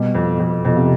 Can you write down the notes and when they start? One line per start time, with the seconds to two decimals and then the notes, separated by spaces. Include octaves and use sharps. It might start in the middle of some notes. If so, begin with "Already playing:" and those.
Already playing: B2 G3
0.15 F2
0.39 F2
0.65 F2 B2
0.77 C3